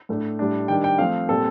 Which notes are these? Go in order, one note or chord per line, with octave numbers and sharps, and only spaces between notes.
A2 A3 D4
A2 G3 D4
D#3 G3 D4 G5
G5
F3 A3 C4 F5
A#2 G3 C4 A4